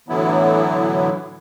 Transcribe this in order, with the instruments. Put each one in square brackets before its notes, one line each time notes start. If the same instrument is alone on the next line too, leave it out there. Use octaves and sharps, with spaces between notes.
[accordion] A2 D3 E3 F#3 B3 E4